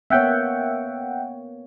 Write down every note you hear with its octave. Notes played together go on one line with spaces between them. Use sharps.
A#3 B3 C#5 E5 F#5 G5